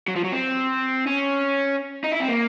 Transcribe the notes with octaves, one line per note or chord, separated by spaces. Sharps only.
F#3
F3
F#3
C4
C#4
D#4
E4
C4
A#3